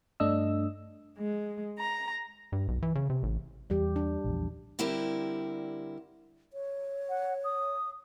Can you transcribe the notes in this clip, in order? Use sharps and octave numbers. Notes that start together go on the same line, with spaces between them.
G2 A3 D4 D#5 E6
G#3
A#5
G2
B1
E3
C#3
C3
A1
E2 G3 G4
D4
A#1 E2
D3 G3 C4 E4 G4 A#4
C#5
F#5
D#6